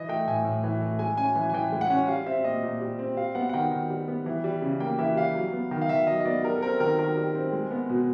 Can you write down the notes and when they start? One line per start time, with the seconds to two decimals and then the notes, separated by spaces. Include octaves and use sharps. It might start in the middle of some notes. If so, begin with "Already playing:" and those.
Already playing: E3 D#5
0.09 A3 G5
0.27 A2 G#5
0.45 A2
0.64 E3
0.81 A3
0.99 G#3 G#5
1.17 C#4 G#5
1.35 E3 G#5
1.49 G#5
1.54 E3 G5
1.73 G#3
1.81 F#5
1.90 C#4
2.08 G3 F5
2.26 C4 E5
2.44 A#2 D#5
2.63 A#2
2.81 G3
2.99 C4
3.17 G3 F5
3.35 B3 F#5
3.49 F#5
3.53 D#3 G5
3.71 D#3
3.90 G3
4.08 B3
4.26 E3
4.44 G3
4.62 C#3
4.80 A#3 G5
4.99 E3 E5
5.16 G3 F5
5.35 F#3
5.53 B3
5.71 D#3
5.82 F5
5.89 D#3 E5
6.07 F#3 D#5
6.20 D#5
6.25 B3 D5
6.43 G3 A#4
6.57 A4
6.62 C4 A#4
6.80 D#3 A#4
6.99 D#3 A#4
7.17 G3
7.35 C4
7.52 G#3
7.71 B3
7.90 B2